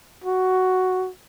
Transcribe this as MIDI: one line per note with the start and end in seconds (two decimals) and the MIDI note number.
0.24 1.10 66